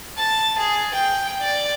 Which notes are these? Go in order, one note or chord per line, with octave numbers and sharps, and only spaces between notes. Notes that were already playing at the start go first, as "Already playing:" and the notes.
A5
G#4
G5
D5